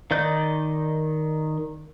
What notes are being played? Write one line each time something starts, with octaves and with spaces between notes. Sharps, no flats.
D#3 D5 D#5 G6